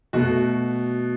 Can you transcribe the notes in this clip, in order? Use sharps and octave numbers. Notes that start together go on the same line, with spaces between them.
B2 A3 F#4